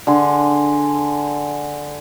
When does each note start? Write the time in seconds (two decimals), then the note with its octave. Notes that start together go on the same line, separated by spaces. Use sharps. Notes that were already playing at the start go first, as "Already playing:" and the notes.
0.07 D3 G#4 C6